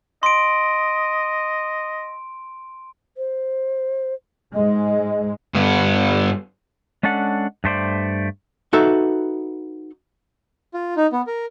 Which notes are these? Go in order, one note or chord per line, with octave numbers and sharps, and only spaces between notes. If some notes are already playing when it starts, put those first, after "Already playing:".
D#5 C6 D7
C5
G#2 G#3 D#5
G2 B3
G#3 C#4 D4 A4 F#5
G2 A3 C5 D5
D#4 F#4 A4 B4 E5
F4
D#4
B3
A#4